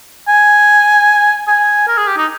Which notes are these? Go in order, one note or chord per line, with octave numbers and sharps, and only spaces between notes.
G#5
G#5
A#4
G#4
G4
D#4